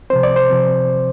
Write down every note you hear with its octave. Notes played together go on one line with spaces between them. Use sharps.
C3 F3 C4 C5
D5
C5
C3 F3 C4